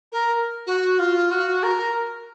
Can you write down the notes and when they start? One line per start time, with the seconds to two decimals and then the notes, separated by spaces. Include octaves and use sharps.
0.12 A#4
0.66 F#4
0.99 F4
1.31 F#4
1.63 A#4